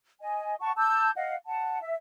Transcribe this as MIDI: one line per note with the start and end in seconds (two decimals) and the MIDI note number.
0.20 0.55 75
0.20 0.55 80
0.60 0.72 78
0.60 0.72 81
0.60 0.72 85
0.77 1.10 81
0.77 1.10 86
0.77 1.10 88
0.77 1.10 91
1.16 1.34 75
1.16 1.34 77
1.16 1.34 78
1.46 1.79 78
1.46 1.79 81
1.81 1.95 76